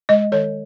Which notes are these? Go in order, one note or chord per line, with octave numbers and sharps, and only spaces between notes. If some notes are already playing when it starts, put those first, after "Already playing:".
G#3 D#5
D#3 C#5